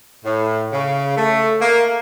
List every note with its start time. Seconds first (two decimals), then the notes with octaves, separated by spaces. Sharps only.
0.24 A2
0.73 C#3
1.17 A3
1.61 A#3